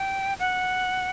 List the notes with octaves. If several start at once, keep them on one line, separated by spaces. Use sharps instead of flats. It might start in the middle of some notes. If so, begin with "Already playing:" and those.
Already playing: G5
F#5